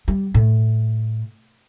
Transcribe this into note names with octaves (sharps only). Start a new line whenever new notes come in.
G3
A2